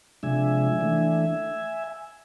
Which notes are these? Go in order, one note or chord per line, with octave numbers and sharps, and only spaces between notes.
C3 F3 G#3 D4 E5 G#5
E3 A3 D4